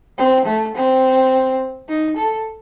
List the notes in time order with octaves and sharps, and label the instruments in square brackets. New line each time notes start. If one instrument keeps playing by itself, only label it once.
[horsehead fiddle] C4
A3
C4
D#4
A4